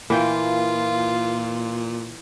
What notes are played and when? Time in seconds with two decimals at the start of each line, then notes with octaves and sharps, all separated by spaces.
0.10 A#2 E3 A#3 F4 G5